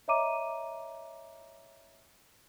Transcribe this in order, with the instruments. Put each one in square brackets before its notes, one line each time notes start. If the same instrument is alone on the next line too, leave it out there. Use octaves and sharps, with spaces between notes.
[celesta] C#5 D#5 E5 A#5 D6 D#7